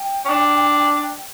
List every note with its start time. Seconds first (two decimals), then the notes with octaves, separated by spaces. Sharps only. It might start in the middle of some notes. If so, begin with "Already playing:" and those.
Already playing: G5
0.25 C#4
0.29 D4